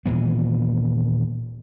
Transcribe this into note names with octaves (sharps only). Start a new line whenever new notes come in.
D#1 A#2 E3 B3